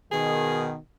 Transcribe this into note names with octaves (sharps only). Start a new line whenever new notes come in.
B2 D#3 G#4